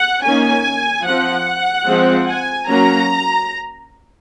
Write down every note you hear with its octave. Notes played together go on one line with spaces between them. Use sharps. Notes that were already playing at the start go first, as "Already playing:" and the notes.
Already playing: F#5
D#3 A#3 C#4 G#5
F3 C4 F#5
F3 G#3 C4
G#5
F#3 A#3 C#4 A#5